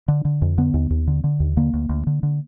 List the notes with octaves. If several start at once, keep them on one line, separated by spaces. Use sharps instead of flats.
D3
D3
F2
D3 B3
D#2
D#2
D3
D3
D#2
D3 A#3
D2
D2
D3
D3